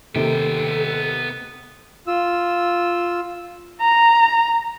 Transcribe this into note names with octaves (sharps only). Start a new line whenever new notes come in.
D#2 C3 D#3 B3 A4 G5
F4 E6
A#5